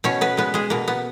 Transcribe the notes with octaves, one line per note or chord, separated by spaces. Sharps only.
B2 C#4 C#5
B3 B4
G#3 B3 B4
G#3 G#4
B2 A#3
B3